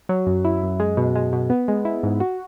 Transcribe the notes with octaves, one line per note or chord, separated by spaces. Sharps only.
F#3
F#2
E4
F#2
G#3
B2
G#3
B2
B3
G#3
E4
G#2
F#4